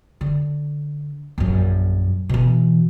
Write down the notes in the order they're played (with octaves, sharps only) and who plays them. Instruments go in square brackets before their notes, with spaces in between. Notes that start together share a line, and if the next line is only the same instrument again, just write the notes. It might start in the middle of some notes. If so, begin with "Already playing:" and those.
[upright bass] D3
A#1 F#2
B2 E3